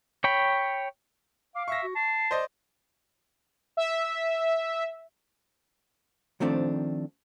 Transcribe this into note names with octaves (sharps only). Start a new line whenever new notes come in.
C#5 G5 B5
F5 D6
E5 C#6 A#6
F#4
A5 C7
C5 D5 D#5
E5
D#3 F3 A3 C4 D4